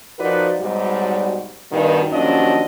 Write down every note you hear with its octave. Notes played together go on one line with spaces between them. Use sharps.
F3 D#4 F#4 A#4 B4 D5
G#2 B2 F#3 G3
G2 B2 D#3
D#2 F3 F#3 C#4 D4 D#5